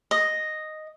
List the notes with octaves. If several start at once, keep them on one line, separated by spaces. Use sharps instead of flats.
D#5